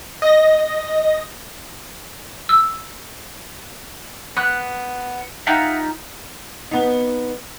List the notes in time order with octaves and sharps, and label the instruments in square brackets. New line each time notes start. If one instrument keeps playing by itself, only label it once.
[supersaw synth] D#5 A#6
[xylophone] E6
[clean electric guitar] B3 [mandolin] F#6
[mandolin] D#4 F4 G4 [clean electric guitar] E5 F#5
[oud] B3 D#4